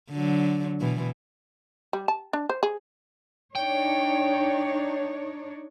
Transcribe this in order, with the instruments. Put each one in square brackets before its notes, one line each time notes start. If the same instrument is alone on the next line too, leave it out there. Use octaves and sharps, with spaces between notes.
[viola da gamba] D3 F#3
B2 E3
[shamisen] G3
A5
D4
C5
G#4
[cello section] D4 D#4 C#5 [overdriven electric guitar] G5